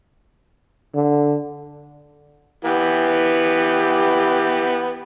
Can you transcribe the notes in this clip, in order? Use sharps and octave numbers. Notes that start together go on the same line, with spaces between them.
D3
E3 B3 G4